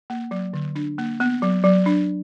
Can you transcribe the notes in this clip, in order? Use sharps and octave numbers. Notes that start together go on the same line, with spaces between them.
A#3
F#3
D3
D4
A#3
B3
F#3
F#3
D4